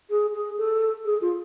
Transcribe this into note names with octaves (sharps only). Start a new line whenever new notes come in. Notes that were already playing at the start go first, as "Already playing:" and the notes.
G#4
G#4
A4
G#4
F4